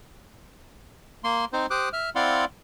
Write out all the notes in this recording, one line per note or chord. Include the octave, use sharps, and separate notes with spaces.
A#3 C6
C4 D#4 C5
G4 C5 D6 D#6 F#6
E5 F6
C4 E4 D5 F5 F#5 C6